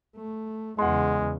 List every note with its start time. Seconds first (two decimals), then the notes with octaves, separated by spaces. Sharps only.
0.16 A3
0.79 E2 C#3 G#3 F#5 C6